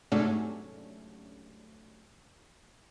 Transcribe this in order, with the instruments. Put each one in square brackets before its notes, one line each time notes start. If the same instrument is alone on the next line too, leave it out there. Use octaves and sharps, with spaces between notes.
[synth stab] G#2 C3 F#3 A3 C#4 D4